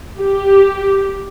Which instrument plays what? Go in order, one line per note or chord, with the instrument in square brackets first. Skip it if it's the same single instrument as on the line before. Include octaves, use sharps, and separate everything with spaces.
[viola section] G4